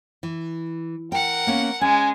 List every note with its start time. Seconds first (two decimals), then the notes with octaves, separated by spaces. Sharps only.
0.23 E3
1.12 A#4 F#5 G5
1.47 A#3 B3 C#4
1.81 G#3 C#4 G#5